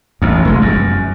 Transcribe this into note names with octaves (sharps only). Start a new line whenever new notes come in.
A1 D#2
F1 G#3
F#2